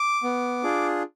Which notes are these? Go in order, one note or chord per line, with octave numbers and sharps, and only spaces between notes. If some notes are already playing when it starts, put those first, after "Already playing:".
Already playing: D6
B3
D4 F4 G#4